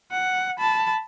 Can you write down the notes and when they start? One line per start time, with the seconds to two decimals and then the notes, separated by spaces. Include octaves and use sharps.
0.11 F#5
0.58 A5 B5